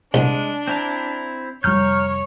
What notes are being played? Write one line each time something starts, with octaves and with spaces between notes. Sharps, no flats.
C2 G#3 D4
C4 E4 A#5
F1 G3 C#5 A#5 C#6 F6 G6